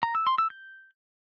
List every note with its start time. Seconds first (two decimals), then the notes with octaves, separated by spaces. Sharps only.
0.03 A#5
0.15 E6
0.27 C6
0.38 E6
0.50 G6